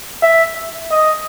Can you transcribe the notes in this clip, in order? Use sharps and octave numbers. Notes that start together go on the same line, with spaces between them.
E5
D#5